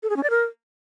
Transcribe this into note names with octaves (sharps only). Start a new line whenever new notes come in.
A4
G#4
C#4
D5
A#4